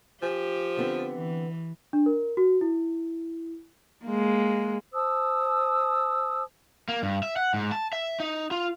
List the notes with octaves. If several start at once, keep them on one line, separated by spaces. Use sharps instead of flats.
F3 G4 G#5
D3 B3 C4
E3
D4
A#4
F#4
E4
G#3 A#3
C5 A5 D#6 E6
A#3
G2
E5
F#5
G#2
A5
E5
D#4
F4